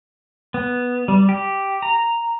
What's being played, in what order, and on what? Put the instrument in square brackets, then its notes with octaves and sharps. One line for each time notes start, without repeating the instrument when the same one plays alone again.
[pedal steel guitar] B3
G3
G4
A#5